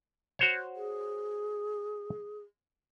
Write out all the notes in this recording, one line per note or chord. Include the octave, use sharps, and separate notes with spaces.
F#4 C5 C#5
G#4